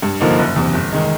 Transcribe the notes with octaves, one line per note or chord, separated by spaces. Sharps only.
G2
D3 F3 A#3 D#4
F#1
E2 C3
G1
D#3 G#3